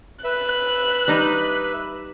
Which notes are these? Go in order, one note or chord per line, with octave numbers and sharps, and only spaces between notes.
B4 E5 F#6
G3 D#4